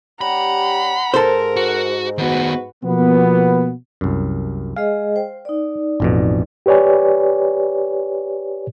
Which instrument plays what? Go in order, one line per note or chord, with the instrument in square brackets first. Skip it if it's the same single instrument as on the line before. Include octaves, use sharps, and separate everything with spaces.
[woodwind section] G3 C#4 G4 [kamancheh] F#5 A#5 [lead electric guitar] B5
[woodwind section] G#2 [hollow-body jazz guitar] A4 C5 [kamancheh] A#4
[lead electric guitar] F#4
[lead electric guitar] D#3 B3 [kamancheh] F#4 B4
[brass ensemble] B2 F3 A#3 B3
[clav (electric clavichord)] C2 F#2
[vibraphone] G#3 G#4 D#5 [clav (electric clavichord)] F5
[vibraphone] C5 G5
D#4 D5
[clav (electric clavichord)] A1 F2 B2
[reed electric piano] G4 B4 C#5 D5 G#5